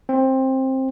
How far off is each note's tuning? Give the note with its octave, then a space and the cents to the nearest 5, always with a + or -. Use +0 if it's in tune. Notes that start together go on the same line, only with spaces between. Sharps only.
C4 +15